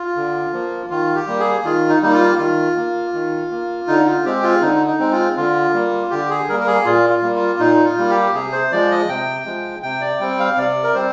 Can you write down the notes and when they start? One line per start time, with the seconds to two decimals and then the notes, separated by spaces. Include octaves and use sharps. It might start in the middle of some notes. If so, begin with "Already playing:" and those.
Already playing: F4
0.16 D3
0.53 F3 A#3
0.90 D#3 F4
1.15 G4
1.27 G3 A#3
1.40 G#4
1.64 D#3 F4
1.89 D#4
2.02 G3 A#3 D#4
2.14 F4
2.39 D#3 F4
2.77 A#3
3.14 D#3
3.51 A#3
3.88 D3 D#4
4.06 F4
4.25 G#3 C4 G4
4.43 F4
4.62 D3 D#4
4.87 D#4
4.99 G#3 C4
5.12 F4
5.37 D3 F4
5.74 G3 A#3
6.10 D3 G4
6.30 G#4
6.49 G3 A#3 A#4
6.60 A#4
6.67 G#4
6.85 A#2 F4
7.10 F4
7.22 G3 A#3
7.35 F4
7.59 A#2 D#4
7.85 F4
7.98 G3 A#3
8.10 G4
8.34 C3 G#4
8.52 C5
8.72 F3 G#3 D5
8.91 D#5
9.08 C3 G5
9.46 F3 G#3
9.83 C3 G5
10.01 D5
10.20 G3 C4 G5
10.39 F5
10.57 C3 D5
10.83 A#4
10.94 G3 C4 C5